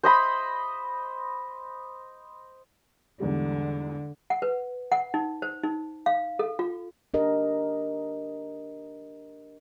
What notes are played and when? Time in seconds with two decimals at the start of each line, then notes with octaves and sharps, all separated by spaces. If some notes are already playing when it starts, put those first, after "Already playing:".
0.03 C5 D#5 B5
3.20 E2 G#2 D3 G3
4.30 F#5
4.42 B4
4.92 F#5
5.14 D#4
5.42 C5
5.63 D#4
6.06 F5
6.39 A4
6.59 F4
7.14 D4 G4 A#4 D#5